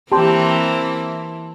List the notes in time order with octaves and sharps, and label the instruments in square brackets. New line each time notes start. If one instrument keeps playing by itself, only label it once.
[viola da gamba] E3 A#3 C4 [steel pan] G4 G5 [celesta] A5 C6